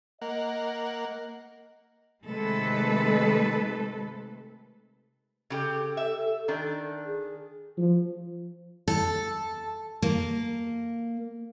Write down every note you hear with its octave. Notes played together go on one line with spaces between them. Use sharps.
A#3 D#5 F#5
C3 D#3 G#3 A3 A4 B4
C#3 G4 A4
E5
D#3 D4
G#4
F3
A4
A#3